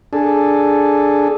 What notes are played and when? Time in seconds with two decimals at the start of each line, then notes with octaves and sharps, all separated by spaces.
0.13 D4 G#4 A4